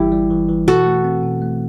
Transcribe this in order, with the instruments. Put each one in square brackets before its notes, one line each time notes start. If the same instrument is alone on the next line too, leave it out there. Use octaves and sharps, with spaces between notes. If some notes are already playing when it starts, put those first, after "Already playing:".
Already playing: [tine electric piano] G1 E3 G3 [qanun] E4 G4
[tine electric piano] G3
E3
E3
[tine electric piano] B2 [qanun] F#4 A4
[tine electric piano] A3
C4
B2
A3